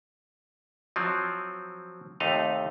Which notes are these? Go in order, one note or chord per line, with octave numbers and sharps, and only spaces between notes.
F3 F#3 C4
D#2 C3 A3 D#4 D#5 F5